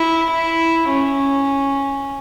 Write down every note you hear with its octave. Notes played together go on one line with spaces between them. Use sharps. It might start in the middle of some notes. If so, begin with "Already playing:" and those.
Already playing: E4
E4
C#4